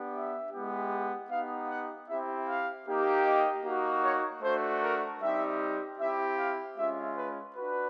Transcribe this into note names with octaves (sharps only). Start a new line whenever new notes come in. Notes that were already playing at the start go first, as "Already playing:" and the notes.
Already playing: B3 D4 G4
E5
G#3 B3 E4 G4
B3 D#4 G4 F5
F#5
C4 E4 G4 E5
F5
A#3 D#4 G4
D#5
A#3 D#4 F#4
C#5
A3 D4 F#4 C5
A#4
G3 C4 D#4 G4 E5
C4 E4 G4 E5
F5
G#3 C#4 F4 E5
B4
D4 F#4 B4